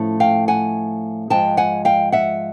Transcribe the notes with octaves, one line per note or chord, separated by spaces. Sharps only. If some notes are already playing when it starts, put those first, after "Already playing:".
Already playing: A2 F3 A3 C#4
F5 G5
F#5 G#5
G#2 F3 G#3 G5 A5
F#5 G#5
F5 G5
E5 F#5